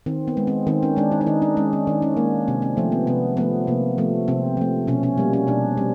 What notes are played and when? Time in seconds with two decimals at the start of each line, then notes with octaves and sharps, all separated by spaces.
0.06 D#3 C4
0.28 B3
0.37 G#3
0.47 C4
0.67 D#3 C4
0.83 C#4
0.96 G#3 D4
1.11 D#4
1.21 D4
1.26 D#3 D#4
1.42 D4
1.57 G#3 C#4
1.73 C#4
1.87 D#3 D4
2.02 C#4
2.17 G#3 A#3
2.48 C3 C4
2.62 C4
2.77 F3 A3
2.92 B3
3.07 C3 B3
3.37 F3 A3 B3
3.67 C3 A#3
3.98 F3 A3 B3
4.28 C3 C4
4.57 F3 A3
4.87 B2 C#4
5.03 C#4
5.18 G3 A#3
5.33 C#4
5.47 B2 D4
5.77 G3 C4